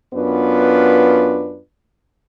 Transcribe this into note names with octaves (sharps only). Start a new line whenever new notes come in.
F#2 B3 D4 F4 B4